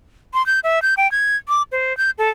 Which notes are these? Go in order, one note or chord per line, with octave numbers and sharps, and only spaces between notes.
C6
G6
E5
G6
G5
G#6
D6
C5
G6
A4